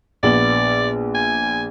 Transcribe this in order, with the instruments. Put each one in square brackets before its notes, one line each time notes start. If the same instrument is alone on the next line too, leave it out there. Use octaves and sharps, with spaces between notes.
[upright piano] A#1 B3 F#7 [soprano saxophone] D5
[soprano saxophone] G#5